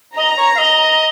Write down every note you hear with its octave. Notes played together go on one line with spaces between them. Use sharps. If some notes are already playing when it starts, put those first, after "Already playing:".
D#5 A#5
C#5
F5
D#5